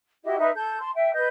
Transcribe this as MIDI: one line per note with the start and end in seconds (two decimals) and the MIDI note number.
0.24 0.35 64
0.24 0.35 66
0.24 0.35 67
0.24 0.35 75
0.38 0.50 63
0.38 0.50 71
0.38 0.50 76
0.54 0.80 69
0.54 0.80 91
0.81 0.91 81
0.81 0.91 84
0.95 1.12 76
0.95 1.12 79
1.14 1.28 71
1.14 1.28 75
1.14 1.28 91